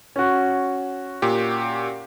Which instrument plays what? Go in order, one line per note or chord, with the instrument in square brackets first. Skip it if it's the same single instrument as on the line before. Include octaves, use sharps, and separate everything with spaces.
[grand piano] C#4 F#4
[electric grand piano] A#2 G4